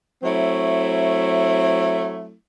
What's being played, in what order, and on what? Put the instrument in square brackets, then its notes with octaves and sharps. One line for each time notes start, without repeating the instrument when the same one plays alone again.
[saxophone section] F#3 A3 C4 E4